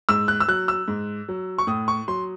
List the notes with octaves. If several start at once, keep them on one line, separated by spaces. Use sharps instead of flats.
G#2 E6
F#6
E6
F#3 F#6
E6
G#2
F#3
C#6
A2 D#6
C#6
F#3 C6